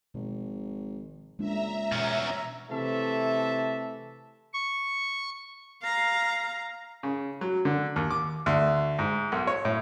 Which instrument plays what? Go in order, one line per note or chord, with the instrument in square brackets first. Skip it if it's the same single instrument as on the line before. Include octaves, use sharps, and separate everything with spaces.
[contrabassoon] G#1 [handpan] B2 F3
[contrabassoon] C#2 [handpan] G#3 A#3 D4 [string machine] E5 A#5
[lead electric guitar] E2 C#4 [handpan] B2
[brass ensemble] C3 E3 A3 E5 A5
[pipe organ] C#6
[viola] F5 A#5
[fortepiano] C#3
F#3
D3
D#2
D6
D2
G#2
B1
C#5
A2